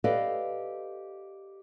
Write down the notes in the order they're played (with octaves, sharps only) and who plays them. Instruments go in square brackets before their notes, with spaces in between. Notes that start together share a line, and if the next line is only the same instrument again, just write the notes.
[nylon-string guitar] G4 A4 B4 D5 D#5 F5